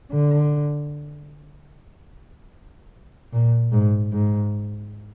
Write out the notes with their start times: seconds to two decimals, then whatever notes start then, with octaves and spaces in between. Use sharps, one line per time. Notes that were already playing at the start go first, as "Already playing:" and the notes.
0.12 D3
3.33 A#2
3.72 G#2
4.13 G#2